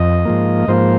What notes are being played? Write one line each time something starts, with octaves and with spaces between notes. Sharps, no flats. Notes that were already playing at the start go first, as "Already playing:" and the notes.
Already playing: F2 D#5
G#2 F3 A#3
G#2 F3 A#3 C5